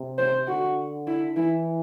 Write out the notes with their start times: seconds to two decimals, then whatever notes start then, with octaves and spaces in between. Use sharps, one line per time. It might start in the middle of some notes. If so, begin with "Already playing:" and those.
Already playing: C3
0.18 C5
0.48 D3 F#4
1.07 E4
1.37 E3 E4